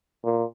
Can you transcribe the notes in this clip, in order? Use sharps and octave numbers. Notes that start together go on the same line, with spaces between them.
A#2